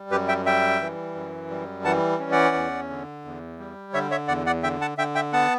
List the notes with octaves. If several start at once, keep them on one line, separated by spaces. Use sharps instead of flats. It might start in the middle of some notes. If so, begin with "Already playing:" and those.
Already playing: G3
F#2 G4 B4
E5 G5
G3 E5 G5
E3
F#2
G3
E3 F#5 A5
C#4
D5 F#5
E2
D3
E2
G3
D3 C#5 E5
C#5 E5
E2 D5 F#5
D5 F#5
D3 E5 G5
F#5 A5
D3 E5 G5
E5 G5
B3 F#5 A5